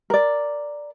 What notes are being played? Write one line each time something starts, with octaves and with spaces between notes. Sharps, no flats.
A#4 D5